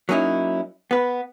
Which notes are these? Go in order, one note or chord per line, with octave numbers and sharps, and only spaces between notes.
F#3 A#3 C#4 D#4 E4
B3 B4